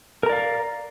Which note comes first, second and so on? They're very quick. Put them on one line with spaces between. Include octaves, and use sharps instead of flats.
A#4 A#5 D5 F5